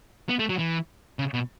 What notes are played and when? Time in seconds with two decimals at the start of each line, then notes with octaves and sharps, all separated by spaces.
0.29 B3
0.39 A3
0.49 F#3
0.59 E3
1.19 C#3
1.34 B2